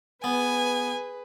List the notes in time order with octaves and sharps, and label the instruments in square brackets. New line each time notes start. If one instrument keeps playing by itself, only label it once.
[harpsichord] B3 [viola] G#4 B4 [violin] G#5